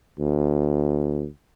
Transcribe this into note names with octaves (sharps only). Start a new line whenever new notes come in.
D2